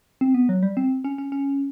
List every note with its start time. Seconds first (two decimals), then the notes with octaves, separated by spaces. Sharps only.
0.21 C4
0.34 B3
0.49 F#3
0.63 G3
0.77 C4
1.04 C#4
1.18 C#4
1.32 C#4